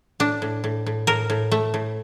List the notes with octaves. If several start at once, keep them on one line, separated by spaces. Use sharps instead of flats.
A2 D4
A2
A2
A2
A2 A#4
A2
A3
A2